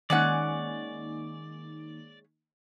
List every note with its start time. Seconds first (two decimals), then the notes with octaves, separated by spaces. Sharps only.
0.10 D#3 G#3 A#3 C#4 D#4 D5 F#5